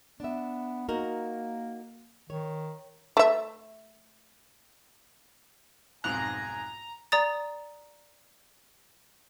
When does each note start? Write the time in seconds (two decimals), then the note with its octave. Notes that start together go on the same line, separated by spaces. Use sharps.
0.20 B3 D4 E5
0.89 A#3 D#4 F#4 A#4
2.30 D#3 C#5
3.17 A3 E5
6.04 B1 F2 G#2 G#5 A#5 F#6
7.12 D5 A#5 D#6 A6